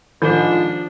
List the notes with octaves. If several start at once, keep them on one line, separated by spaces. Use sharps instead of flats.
G#2 D#3 F3 D4 F4